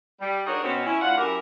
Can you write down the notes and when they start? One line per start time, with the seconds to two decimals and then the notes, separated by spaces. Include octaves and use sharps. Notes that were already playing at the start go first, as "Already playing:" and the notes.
0.21 G3
0.47 D4 D#4 F#4 G#4 A#4 C#5
0.63 B2 C4 C#4
0.85 C#4 E4
1.02 A2 D4 F4 F#5
1.18 F#2 E4 G4 A#4